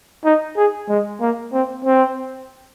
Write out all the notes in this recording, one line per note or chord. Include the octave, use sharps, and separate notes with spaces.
D#4
G#4
G#3
A#3
C4
C4